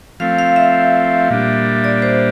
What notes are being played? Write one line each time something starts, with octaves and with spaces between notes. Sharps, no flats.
F3 A3 C4 F5
F5
E5
A#2 G3 D4
D5
C5